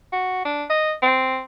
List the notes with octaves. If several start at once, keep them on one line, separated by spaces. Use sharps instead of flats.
F#4
D4
D#5
C4